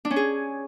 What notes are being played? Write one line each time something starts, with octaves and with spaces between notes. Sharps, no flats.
D4
C#4
G#4